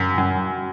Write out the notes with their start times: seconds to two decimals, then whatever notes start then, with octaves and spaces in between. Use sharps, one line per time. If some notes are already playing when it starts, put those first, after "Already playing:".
Already playing: F#2
0.18 F#2